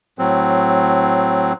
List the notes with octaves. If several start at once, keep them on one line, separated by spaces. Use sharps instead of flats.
A2 F#3 C4